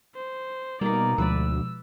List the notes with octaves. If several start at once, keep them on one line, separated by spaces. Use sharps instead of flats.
C5
B2 G3 A#3 D#4 A#4 D5
D2 B2 F3 G#3 B4 D5 E6